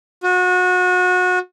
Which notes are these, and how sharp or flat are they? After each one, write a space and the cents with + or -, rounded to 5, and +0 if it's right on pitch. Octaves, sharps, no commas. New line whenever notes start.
F#4 -30